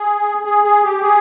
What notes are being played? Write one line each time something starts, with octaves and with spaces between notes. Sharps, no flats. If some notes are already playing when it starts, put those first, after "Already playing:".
Already playing: G#4
G#4
G#4
G4
G#4